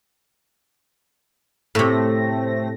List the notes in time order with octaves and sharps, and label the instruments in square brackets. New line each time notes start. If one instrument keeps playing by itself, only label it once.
[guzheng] A2 C3 [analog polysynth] A3 C4 A#6